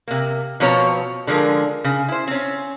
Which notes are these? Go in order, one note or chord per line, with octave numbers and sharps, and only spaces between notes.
C3 A#3
B2 F3 C4 C#5 A#5
D3 F3 G#3 A#4
C#3
E4 C5
C4 C#4